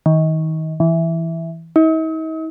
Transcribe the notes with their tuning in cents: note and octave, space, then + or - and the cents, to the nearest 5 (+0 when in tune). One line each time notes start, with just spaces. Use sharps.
D#3 +30
E3 +0
D#4 +45